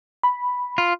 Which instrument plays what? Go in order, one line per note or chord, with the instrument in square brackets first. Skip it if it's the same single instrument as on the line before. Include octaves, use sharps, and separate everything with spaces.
[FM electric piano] B5
[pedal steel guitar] F4